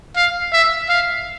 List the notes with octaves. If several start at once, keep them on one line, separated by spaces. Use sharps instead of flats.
F5
E5
F5